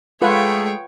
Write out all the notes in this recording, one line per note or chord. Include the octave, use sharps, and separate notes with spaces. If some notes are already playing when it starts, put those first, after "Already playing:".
G#3 A3 F4 G#4 B4 C#5 F#5 G5